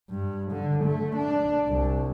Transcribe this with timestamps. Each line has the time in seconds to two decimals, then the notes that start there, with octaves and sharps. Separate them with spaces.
0.10 G2
0.53 D3
0.85 A3
1.17 D4
1.68 C2